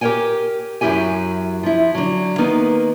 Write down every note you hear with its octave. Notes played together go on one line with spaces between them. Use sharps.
G4 A#4 B4 C#5 G5 G#5
F#2 F#3 D4 E4 G4 G#5
F3 E4
D3 F#3
D#3 A#3 B3 D#4